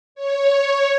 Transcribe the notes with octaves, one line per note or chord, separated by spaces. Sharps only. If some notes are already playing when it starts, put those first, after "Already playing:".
C#5